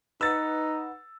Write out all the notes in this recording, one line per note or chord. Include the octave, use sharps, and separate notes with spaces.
D#4 B4 F#5 E6 A6